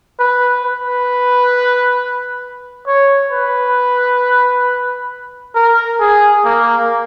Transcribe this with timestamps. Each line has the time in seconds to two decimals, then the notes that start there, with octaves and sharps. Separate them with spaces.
0.19 B4
0.64 B4
2.87 C#5
3.31 B4
5.55 A#4
6.00 G#4
6.45 A#3